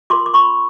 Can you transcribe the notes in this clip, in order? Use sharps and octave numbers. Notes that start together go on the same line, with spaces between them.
F4 A#4 C6 D6
D6
C#4 B5 C#6